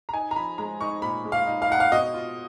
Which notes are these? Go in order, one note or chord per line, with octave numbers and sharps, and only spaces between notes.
A#5
D#4 G#5
A#5
F3 B5
G#3 A#5
D#4 C#6
A#2 B5
G#3
F5
D#4
F5
D#4 F#5
F5
B2 D#5
F4